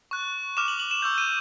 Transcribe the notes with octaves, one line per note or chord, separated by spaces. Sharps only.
C#6 F#6
D6 F6 E7
F#7
F#7
E7
C#6 E6 G6
D#7